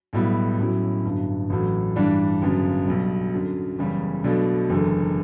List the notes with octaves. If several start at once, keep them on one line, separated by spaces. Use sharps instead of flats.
B1 A2 G3 B3 E4
B1 A2 F#3 C#4 E4
G1 G2 F#3
A1 A2 F#3
G2 E3 G3 D4
G1 F#2 C#3
B1 B2 G3
F#2 D3 F#3
F#1 E2 C#3 G3 C#4
B1 B2 A3 D4
F#1 E2 D3 A3